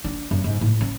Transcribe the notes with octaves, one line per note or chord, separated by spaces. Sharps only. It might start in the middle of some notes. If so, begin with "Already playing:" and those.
D4
F#2
G#2
A2
C#4